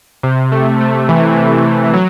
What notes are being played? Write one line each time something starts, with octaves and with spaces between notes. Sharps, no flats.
C3
A3
A3
E3
C3
C3
F#3